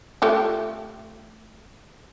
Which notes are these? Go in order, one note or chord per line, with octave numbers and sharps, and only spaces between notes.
A3 F4 G4